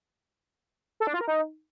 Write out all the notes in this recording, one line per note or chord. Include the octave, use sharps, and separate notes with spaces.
A4
D4
F4
A#4
D#4